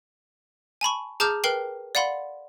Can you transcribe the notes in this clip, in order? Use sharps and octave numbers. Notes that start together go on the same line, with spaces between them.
G#5 A5 B5 C#6
G#4 A5 A#5 D6 F6 G6
A#4 B4 G5 F6 C7 F#7
D5 F5 F#5 B5 C6